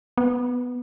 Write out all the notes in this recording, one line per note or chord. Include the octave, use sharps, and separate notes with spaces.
B3